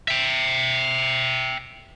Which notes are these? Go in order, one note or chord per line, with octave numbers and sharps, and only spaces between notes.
E5 G5